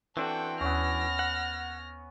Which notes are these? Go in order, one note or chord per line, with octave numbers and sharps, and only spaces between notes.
E3 C4 D4 F#4 A4 G5
D#2 B3 C#4 C#6 F6 A#6
F#5